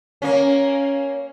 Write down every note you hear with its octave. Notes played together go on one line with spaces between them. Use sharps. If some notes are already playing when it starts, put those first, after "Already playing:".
A#3 C#4